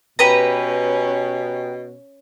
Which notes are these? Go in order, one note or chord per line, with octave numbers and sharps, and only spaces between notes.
B2 C#4 G4 B4 A#5